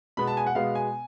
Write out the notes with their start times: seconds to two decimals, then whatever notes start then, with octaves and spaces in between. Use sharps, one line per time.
0.17 B2 G#3 B3 B5
0.27 A5
0.37 G#5
0.46 F#5
0.55 B2 G#3 B3 F5
0.75 G#5